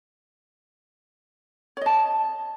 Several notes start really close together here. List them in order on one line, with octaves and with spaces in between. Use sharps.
C#5 D#5 A5